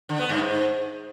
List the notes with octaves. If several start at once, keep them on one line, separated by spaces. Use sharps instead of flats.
D3
B3
G2
G#2